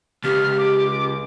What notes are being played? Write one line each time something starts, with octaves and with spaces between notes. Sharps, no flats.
C#2 G4 F6
D6